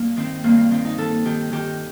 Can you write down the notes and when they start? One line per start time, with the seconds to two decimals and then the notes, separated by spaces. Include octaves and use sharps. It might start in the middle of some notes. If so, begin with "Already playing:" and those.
Already playing: G2 A#3
0.17 D#3 C4
0.44 G2 A#3
0.58 A#3
0.71 D#3 C4
0.85 D#4
0.98 D#3 A4
1.25 D#3 G4
1.52 D#3 G4